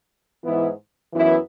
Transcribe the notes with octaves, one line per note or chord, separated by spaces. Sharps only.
G#2 E3 B3 E4
F#2 E3 B3 E4